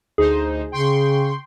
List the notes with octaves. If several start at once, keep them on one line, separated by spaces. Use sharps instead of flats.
D2 D#4 G#4 C5
C#3 G5 C6 C#6